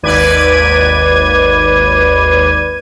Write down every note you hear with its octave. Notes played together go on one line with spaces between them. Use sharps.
G#1 D#2 B4 D5 G#6 D#7